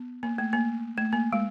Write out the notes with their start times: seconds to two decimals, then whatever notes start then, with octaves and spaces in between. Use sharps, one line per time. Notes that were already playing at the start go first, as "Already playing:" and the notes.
Already playing: B3
0.23 A#3
0.38 A3
0.53 A#3
0.97 A3
1.13 A#3
1.33 G#3